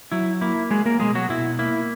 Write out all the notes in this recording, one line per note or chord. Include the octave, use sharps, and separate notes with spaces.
F#3 E4
A#3 E4
F#3 G#3 G#4
A#3 A#4
B2 G#3 G#4
F#3 F#4
B2 E4
A#3 E4